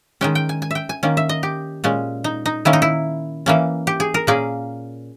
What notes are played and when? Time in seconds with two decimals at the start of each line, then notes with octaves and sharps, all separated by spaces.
0.21 D#3 G#3 C#4 G5
0.35 G5
0.49 G#5
0.62 G#5
0.71 E5 G5
0.89 G#5
1.03 D#3 A#3 C#4
1.17 E5
1.29 D#5
1.43 G4
1.84 A#2 G#3 C#4
2.24 D#4
2.46 D#4
2.65 D#3 A#3 C#4 E4
2.73 D#4
2.82 E4
3.46 E3 A#3 C#4
3.87 G4
4.00 G#4
4.14 A#4
4.27 A#2 A#3 C#4 G#4